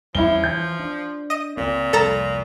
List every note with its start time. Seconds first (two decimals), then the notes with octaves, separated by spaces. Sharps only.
0.15 E2 F3 G3 C#4 E4 G7
0.44 E3 G6
0.79 D4
1.30 D#5 D#7
1.57 C#2 A#2 C4
1.93 C2 F2 A2 A4 A5 A#5